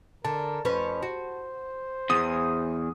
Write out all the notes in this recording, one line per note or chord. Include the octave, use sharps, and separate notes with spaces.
D3 A#4 A5
F2 C#4 B4 C5
F#4
E2 D#6